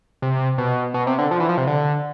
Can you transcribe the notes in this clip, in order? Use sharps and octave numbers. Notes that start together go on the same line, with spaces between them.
C3
B2
B2
C3
D3
F3
E3
F3
C3
D3